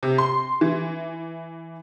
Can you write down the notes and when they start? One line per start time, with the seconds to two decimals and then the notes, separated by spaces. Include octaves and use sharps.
0.03 C3
0.18 C6
0.61 E3